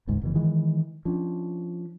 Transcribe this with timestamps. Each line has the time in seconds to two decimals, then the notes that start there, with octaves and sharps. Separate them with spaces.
0.07 D#1 G#1 C#2 G#2
0.22 F#1 B2 E3
0.35 D#3 E3 G#3
1.05 F3 C#4 D4